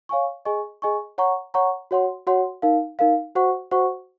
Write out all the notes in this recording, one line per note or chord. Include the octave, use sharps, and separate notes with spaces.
C#5 F5 G#5 C#6
G#4 D#5 G#5 C#6
G#4 D#5 G#5 C#6
C#5 F#5 A#5 C#6
C#5 F#5 A#5 C#6
F#4 C#5 F#5 C6
F#4 C#5 F#5 C6
D#4 A#4 F5
D#4 A#4 F5
F#4 C5 F#5 C#6
F#4 C5 F#5 C#6